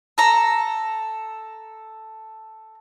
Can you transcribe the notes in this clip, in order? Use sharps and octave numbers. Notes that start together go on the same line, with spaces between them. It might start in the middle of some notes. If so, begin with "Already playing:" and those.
A4 A#5